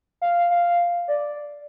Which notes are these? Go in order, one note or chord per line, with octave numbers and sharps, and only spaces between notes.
F5
F5
D5